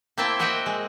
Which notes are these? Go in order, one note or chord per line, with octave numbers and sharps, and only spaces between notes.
A#3 C4 E4 E5 G5 A5
F#4 A#4 D#5 E5 F#5 G5
G#3